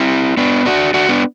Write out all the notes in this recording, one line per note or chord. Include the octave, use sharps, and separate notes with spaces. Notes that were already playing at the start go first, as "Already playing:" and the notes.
Already playing: C4 E4
B3 D4
D4 F#4
D4 F#4
B3 D4